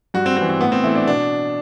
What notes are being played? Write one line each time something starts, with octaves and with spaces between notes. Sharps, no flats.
G2 F#4
C4
E3 B3 C4
C4
A2 B3
C4
E3 A3 E4
D4
B2 D4